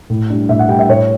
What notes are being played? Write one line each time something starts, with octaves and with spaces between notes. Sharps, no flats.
A2
G3 D4
A2 E5
F#5
G3 D4 G5
E5
A2 C#5